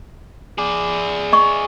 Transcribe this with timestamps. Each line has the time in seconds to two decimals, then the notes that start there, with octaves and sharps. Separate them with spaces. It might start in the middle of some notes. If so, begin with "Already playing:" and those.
0.58 G#4 D5
1.33 D#5 C#6